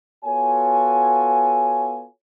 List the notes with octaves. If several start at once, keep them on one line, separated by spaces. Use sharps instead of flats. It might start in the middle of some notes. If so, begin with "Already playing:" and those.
B3 F4 F#4 A4 C#5 G#5